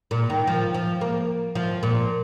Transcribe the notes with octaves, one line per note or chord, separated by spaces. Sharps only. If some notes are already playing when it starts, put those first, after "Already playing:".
A#2
D#3
F3
F3
A#3
F3
A#2